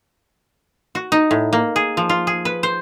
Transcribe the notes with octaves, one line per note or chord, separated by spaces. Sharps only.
F#4
D#4
A2
A#3
G#4
F3
F4
G#4
B4
C5